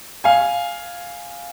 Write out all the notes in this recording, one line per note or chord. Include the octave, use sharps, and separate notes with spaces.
F5 G#5